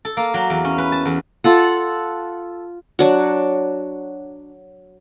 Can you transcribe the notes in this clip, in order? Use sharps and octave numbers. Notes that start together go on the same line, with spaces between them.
A4
A#3
F#3
E2
C#4
B4
A5
E2
F4 A4 F#5
F#3 D4 F#4